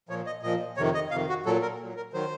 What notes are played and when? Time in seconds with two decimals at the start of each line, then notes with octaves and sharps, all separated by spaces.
0.09 A#2 F3 C#5
0.26 D#5
0.43 A#2 F3 D#5
0.77 F2 C3 D#3 C#5
0.95 D#5
1.11 F2 C3 D#3 F5
1.29 F#4
1.46 A#2 F#3 A4
1.62 A#4
1.80 A#2 F#3
1.96 A#4
2.13 D#3 F#3 C5